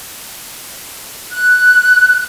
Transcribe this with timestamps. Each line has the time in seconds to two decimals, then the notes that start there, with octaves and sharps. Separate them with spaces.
1.31 F#6